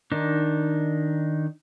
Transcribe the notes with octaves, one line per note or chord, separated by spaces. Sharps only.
D#3 D4 D#4